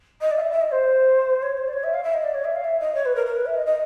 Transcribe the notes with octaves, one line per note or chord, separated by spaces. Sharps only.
D#5
D5
F5
E5
E5
D#5
C5
C#5
C5
D5
C#5
E5
F5
E5
D#5
D5
C#5
E5
F5
E5
D#5
C#5
B4
A#4
A#4
B4
E5
D#5
D#5